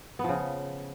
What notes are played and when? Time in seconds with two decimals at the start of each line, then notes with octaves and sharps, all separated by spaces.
0.19 B3
0.24 F3
0.29 C#3